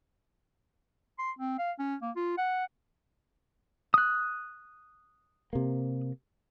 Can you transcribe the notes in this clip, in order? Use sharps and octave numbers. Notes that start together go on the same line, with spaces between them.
C6
C4
F5
C#4
A#3
F4
F#5
D#6 F#6
C3 A#3